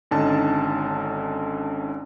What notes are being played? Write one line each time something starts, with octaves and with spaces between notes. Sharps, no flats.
G#1 D3 C#4 D#4 A5